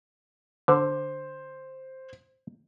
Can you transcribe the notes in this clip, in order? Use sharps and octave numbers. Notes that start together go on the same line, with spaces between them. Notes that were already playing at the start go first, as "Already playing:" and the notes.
D3 C5